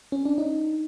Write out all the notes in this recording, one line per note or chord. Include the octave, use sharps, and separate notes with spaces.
C#4
D4
D#4